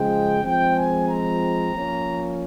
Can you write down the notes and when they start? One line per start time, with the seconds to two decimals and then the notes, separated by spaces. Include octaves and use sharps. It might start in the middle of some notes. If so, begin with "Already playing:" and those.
Already playing: C#3 F3 G#3 G5
0.43 F3 G#3 C4 G5
0.76 G#5
1.08 A#5
1.74 F3 A#3 C#4